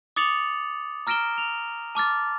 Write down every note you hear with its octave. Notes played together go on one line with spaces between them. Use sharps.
D6 D#6 A6 C#7 F7 F#7
A#5 F6 A#6 D7 E7 G7
F7
A5 D6 F6 A6